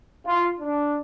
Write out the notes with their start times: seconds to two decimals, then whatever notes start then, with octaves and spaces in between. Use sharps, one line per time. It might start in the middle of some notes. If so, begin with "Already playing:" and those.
0.25 F4
0.59 D4